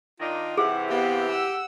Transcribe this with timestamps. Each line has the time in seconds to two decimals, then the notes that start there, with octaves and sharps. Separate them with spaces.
0.20 D#3 D4 D#4 F4
0.58 C3 E3 G#4 F#5
0.90 B3 G4 F5
1.31 F#5 E6